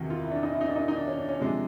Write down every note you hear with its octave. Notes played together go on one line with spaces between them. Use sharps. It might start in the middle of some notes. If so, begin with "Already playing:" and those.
Already playing: E2 C3 D#3 F#4
F4
E4
D4
D#4
E4
D#4
D4
D#4
D#4
D4
C#4
D4
C#4
C3 F3 G#3 D4